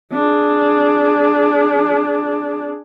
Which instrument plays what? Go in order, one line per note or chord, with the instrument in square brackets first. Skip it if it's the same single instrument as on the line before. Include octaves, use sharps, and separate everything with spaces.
[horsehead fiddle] D4 G#4